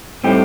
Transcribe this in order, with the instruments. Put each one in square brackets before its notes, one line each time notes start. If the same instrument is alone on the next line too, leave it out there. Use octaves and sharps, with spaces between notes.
[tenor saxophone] A2 [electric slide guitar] G3 C4 D#4 G4